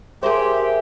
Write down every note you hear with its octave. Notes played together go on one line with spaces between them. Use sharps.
G4 G#4 A#4 C5 E5